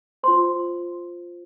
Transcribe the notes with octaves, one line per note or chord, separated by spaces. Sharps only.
F4 C5 C6